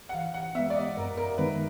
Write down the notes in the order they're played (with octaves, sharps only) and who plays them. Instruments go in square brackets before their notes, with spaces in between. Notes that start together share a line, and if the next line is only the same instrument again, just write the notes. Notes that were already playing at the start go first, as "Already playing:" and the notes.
[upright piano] F#5
[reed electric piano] E3 [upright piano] F5
[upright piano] F#5
[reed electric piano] B3 [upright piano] E5
[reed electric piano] G#3
[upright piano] D5
D#5
[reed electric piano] F#2 [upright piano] A#4
[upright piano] A#4
[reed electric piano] D#3 G#3 B3 D#4 [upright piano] B4